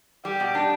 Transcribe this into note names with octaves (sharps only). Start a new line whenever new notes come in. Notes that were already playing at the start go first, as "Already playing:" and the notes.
G3 G4
B2
D4